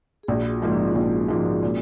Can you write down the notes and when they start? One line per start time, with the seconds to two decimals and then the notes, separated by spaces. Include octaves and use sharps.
0.23 G#4
0.28 A#1 F#4
0.51 F4
0.62 G#2 F3 A#3 D#4
0.73 C#4
0.91 D#4
0.95 A#1 F4
1.12 F#4
1.28 G#2 F3 A#3
1.39 A#4
1.46 G#4
1.63 A#2